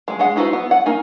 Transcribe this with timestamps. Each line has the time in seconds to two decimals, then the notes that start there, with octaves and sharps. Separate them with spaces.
0.08 G#3 G#4
0.19 G#3 G#4 F#5
0.36 D#4 E4 F#4 B4 C5
0.53 B3
0.71 F#5
0.86 A#3 D#4 G#5